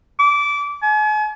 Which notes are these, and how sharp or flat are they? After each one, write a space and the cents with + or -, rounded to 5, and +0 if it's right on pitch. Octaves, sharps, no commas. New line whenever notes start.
D6 -20
G#5 +40